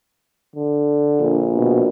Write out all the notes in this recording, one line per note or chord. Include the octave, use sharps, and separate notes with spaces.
D3
A#1
B2